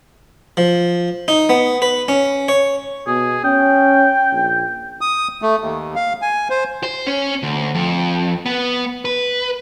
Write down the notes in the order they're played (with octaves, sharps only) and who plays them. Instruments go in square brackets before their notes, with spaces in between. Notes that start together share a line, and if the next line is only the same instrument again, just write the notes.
[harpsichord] F3
D#4
B3
B4
C#4
C#5
[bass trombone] B2 [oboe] G#4
[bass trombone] C#4 [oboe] G5
[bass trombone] A#1
[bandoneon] D#6
A3
D#2
F5
G#5
C5
[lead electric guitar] C5
C#4
D2
F2
B3
B4